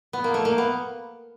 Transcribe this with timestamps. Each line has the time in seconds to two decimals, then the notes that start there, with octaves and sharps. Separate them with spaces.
0.13 B3
0.24 A#3
0.34 A3
0.45 A#3
0.58 B3